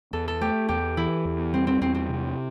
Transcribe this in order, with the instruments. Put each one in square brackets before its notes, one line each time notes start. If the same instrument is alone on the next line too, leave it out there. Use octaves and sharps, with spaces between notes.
[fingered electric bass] E2 [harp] A4
[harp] A4
[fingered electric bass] A3 [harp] G4
[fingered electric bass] E2 [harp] G4
[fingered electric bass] E3 [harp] E4
[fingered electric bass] E2
[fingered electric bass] G3 [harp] C4
[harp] C4
[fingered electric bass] E2 [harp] C4
[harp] C4
[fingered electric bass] C3